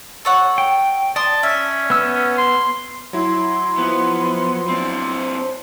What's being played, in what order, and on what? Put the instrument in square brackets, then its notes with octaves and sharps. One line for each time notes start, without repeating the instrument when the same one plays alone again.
[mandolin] A4 C#5 F#5
[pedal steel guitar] G5
[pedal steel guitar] D5 [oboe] A5 [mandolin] C6 D#6
[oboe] C#4 [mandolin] E5
[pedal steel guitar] B3 E6
[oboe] C6
[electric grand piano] F#3 E4 [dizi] C6
[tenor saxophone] F3 [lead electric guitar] B3
[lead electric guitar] C4 D4 [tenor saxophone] C5